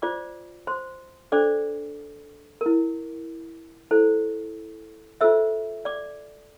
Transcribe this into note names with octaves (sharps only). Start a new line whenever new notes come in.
F4 C5 D5 D6
C5 C6
D4 A4 C5 D5 D6
E4 A#4
E4 A4 C5
F4 A4 C5 E5 E6
D5 D6